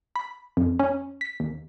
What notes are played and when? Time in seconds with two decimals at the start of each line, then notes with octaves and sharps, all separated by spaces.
0.16 B5
0.57 F2
0.79 C#4
1.21 B6
1.40 D#2